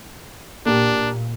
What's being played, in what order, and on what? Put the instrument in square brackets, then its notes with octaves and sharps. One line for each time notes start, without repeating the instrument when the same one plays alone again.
[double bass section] A#2 [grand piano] A#3 G4 [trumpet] D4